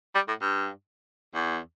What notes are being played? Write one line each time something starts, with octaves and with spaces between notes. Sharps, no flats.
G3
A2
G2
E2